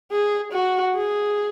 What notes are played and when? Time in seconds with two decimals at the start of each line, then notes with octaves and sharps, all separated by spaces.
0.11 G#4
0.52 F#4
0.95 G#4